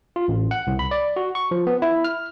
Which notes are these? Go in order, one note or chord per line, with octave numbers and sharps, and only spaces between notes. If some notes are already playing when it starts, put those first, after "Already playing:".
F4
A1
F#5
C2
B5
D5
F#4
C#6
F3
B3
E4
F6